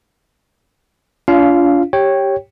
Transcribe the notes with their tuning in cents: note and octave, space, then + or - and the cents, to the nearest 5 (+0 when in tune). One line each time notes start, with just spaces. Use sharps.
D4 -45 F4 -20 F5 +0
G4 +0 C#5 -10 G5 +0